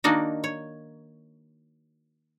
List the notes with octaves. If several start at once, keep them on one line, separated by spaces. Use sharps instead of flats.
D#3 A#3 D4 D#4 F#4
C#5